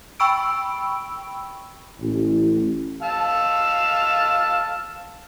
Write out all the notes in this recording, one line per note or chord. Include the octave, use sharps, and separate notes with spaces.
G5 B5 C#6 E6 D7
A1
F5 A5 E6